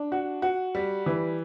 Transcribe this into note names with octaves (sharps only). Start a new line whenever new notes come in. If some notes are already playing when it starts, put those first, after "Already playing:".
Already playing: D4
F#4
F#4
G3
E3